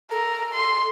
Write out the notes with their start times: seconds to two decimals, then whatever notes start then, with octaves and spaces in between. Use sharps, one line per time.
0.11 A4 A#4
0.54 C6